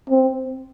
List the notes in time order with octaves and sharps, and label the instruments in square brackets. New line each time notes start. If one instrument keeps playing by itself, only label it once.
[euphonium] C4